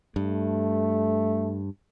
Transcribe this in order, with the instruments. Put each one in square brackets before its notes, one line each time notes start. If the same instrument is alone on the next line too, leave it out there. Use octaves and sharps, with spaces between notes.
[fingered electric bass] G2 [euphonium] A3